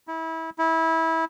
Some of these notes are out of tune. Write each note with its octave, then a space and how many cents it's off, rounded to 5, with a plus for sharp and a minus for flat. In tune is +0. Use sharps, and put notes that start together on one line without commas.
E4 -25
E4 -20